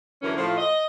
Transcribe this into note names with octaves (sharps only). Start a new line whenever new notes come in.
F#2 D3 E3 C#4 A#4
A2 F3
D#5